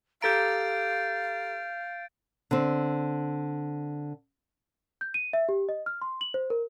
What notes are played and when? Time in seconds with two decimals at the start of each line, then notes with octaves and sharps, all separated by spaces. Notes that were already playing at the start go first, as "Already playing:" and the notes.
0.22 G4 A4 F5 A#5 G6 A6 D7
2.51 D3 C4
5.01 G6
5.14 D#7
5.33 E5
5.49 G4
5.69 D#5
5.86 F6
6.02 C6
6.21 F#7
6.34 C5
6.50 A#4